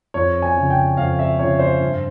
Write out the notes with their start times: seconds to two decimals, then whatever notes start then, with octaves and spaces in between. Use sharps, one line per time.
0.14 F2 C#5
0.42 G#5
0.56 C#3 F3
0.70 G5
0.97 F2 F5
1.19 E5
1.39 C#3 F3 C#5
1.59 C5
1.80 G2